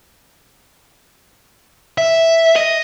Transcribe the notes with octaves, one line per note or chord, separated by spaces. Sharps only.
E5
D#5